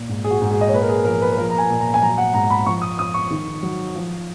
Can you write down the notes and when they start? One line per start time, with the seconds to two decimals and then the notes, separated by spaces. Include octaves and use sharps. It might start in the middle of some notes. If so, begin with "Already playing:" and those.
Already playing: A#2
0.09 G#2
0.24 G#4
0.31 F#4
0.41 G#2
0.51 G#4
0.61 D#5
0.68 C#5
0.72 A#2 B4
0.82 A#4
0.89 G#4
1.05 F3 A#4
1.22 B4
1.33 B4
1.37 F3 A#4
1.50 A#5
1.58 G#5
1.70 A#2
1.80 A#5
1.94 G#5
2.02 F#3 A#5
2.18 F#5
2.34 G#2 A#5
2.50 B5
2.66 F3 C#6
2.82 D#6
2.99 F3 D#6
3.14 C#6
3.30 D#3
3.63 F#3
3.95 F3